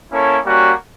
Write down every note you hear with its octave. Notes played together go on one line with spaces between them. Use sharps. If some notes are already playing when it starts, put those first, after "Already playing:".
A#3 C#4 E4 A4 C#5
G3 A#3 C#4 F#4